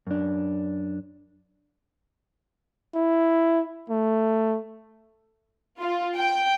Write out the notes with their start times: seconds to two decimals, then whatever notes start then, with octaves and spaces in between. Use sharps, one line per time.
0.07 F#2 D4
2.95 E4
3.90 A3
5.80 F4
6.18 G5